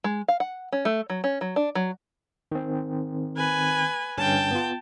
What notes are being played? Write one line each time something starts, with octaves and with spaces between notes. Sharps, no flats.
G#3
F5
F#5
C#4
A3
F#3
C#4
F#3
D4
F#3
D#3 C4
B4 G#5
G2 D3 C#4 G5 A5
B3 F4